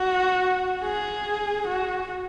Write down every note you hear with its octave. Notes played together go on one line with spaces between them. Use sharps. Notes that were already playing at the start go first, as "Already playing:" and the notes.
Already playing: F#4
G#4
F#4